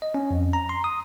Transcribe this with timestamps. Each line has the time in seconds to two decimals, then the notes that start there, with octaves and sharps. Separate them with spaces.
0.02 D#5
0.14 C#4
0.31 F2
0.53 A#5
0.69 C6
0.84 D#6